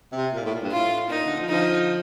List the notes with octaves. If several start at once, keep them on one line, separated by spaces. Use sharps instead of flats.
C3
A#2
A2
A#2
G2
A2 F4
A#2 D#4
A#2 D3
D3 F3
D3 F3 D#4